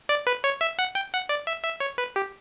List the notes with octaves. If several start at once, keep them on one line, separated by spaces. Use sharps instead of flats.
D5
B4
C#5
E5
F#5
G5
F#5
D5
E5
E5
C#5
B4
G4